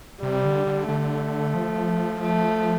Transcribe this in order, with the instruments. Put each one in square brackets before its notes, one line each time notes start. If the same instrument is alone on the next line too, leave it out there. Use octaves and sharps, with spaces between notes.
[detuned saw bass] C3 [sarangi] G3
[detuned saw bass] D3
D3
[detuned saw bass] D3 [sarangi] A3
[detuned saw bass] F3
[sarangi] A3